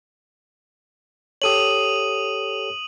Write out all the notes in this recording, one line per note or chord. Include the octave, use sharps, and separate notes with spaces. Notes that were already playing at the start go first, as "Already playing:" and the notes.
G4 A4 C#5 D#6 D#7 F#7